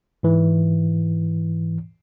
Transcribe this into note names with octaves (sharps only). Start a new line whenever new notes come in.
G#2 E3